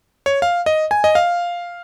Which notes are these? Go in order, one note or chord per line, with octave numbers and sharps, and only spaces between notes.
C#5
F5
D#5
G#5
D#5
F5